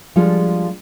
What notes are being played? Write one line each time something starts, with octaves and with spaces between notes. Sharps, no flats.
F3 G3 G#3 D4 F4 A4